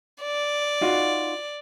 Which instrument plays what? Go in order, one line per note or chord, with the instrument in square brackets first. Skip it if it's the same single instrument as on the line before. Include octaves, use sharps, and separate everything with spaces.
[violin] D5
[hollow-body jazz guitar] D#4 F4 F#4